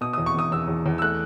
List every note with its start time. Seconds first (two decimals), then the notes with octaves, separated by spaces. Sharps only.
0.01 B2 D#6
0.13 D#6
0.18 E2
0.26 C#6
0.34 E2 D#6
0.52 E2 E6
0.68 E2
0.86 E2
0.98 E6
1.02 A3 F#6